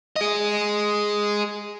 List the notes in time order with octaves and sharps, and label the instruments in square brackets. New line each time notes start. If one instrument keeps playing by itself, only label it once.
[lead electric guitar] G#4 D#5